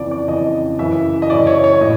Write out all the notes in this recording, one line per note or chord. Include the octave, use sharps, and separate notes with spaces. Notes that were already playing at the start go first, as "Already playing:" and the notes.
Already playing: F2 C#3 E3 D5
D5
F2 C#3 E3 D#5
F#2 C#3 E3 E5
D#5
F#2 C#3 E3 D5
C#5
C#5
A2 D#5